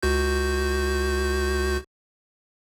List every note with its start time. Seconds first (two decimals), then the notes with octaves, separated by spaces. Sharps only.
0.03 C#2 F#4 G6